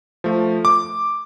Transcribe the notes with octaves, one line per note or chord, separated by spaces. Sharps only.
F3 A3
D6